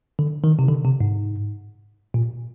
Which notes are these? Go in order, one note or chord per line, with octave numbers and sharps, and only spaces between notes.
D3
D#3
C3
D3
C3
G#2
A#2